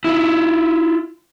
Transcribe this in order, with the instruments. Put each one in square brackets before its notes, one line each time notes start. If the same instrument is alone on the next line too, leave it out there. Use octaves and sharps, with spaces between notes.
[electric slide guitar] E4 F4